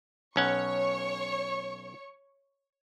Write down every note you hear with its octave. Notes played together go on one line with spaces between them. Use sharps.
B1 C#4 C#5 F#5 C#6